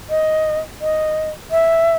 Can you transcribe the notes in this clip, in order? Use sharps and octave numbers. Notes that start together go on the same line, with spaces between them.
D#5
D#5
E5